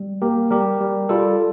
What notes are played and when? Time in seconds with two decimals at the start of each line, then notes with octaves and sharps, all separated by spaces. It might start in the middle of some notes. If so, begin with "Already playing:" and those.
Already playing: G3
0.22 A#3 G4 A#4
0.51 G3 G4 A#4
0.80 G3
1.09 G3 F4 A4